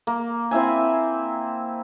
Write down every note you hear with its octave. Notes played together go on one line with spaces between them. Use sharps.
A#3
C4 E4 E5 G#5